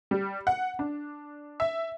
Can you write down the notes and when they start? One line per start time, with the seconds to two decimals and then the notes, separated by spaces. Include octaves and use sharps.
0.11 G3
0.47 F#5
0.79 D4
1.60 E5